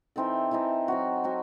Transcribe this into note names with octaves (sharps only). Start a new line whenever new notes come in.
E3 C4 D#4 A4
E3 C4 D#4 A4
F#3 C4 F#4
F#3 C4 F#4